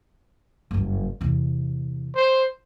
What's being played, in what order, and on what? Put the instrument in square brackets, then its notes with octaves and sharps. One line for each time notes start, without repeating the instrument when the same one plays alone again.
[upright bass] F#1 G2
E2 C3
[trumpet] C5